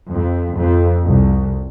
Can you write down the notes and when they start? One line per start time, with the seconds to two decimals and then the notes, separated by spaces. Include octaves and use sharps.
0.12 F2
0.59 F2
1.06 C2